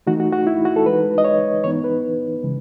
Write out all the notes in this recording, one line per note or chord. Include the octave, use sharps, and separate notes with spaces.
E3 A3 D#4 F#4
F#4
F#4
E4
F#4
A4
E3 G#3 D#4 B4
D#5
C#5
E3 B3 D#4 C#5
B4
C#3 E3 G#3 C#4